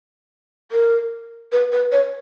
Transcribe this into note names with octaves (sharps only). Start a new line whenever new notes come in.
A#4
B4
B4
C#5